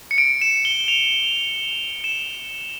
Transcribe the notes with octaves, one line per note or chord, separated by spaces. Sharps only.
C#7
D7
E7
G7
F7
E7